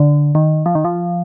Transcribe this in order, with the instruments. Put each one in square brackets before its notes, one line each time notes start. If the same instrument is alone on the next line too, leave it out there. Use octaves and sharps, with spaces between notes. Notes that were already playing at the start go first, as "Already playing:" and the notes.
Already playing: [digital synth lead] D3
D#3
F3
D#3
F3